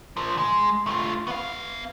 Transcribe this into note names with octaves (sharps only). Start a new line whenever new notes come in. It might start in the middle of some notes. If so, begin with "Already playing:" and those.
F3 A#4
G#3
A3 F4
B3 F5